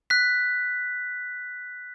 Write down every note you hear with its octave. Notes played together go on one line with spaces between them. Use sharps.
F#6 B6